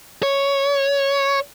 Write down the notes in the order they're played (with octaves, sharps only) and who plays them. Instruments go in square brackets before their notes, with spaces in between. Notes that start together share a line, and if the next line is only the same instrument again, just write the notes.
[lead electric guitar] C#5